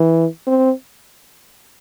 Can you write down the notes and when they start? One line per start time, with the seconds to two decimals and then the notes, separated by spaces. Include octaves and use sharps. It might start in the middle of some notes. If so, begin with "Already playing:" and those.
Already playing: E3
0.47 C4